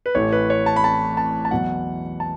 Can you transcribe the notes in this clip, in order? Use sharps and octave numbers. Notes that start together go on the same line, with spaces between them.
B4
A1 A2 E3 A3 C#5
B4
C#5
A5
B5
A5
A5
A5
E2 B2 F#3 F#5
A5